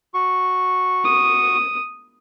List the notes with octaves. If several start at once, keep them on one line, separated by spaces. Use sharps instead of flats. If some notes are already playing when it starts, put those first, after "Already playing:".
F#4 C#6
D#6